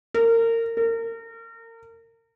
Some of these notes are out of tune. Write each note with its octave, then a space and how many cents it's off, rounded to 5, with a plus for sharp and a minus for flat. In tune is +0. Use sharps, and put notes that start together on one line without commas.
A#4 -25
A#4 -35